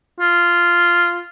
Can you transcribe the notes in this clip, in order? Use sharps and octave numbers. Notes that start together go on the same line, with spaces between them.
F4